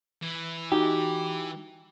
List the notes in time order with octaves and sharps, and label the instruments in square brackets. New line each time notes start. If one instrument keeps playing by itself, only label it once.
[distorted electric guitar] E3
[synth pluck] D#4 F#4 [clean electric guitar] G4